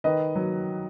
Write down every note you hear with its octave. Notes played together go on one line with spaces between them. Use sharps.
D#3 B4 D#5
F#3